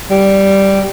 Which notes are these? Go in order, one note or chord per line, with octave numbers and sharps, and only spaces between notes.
G3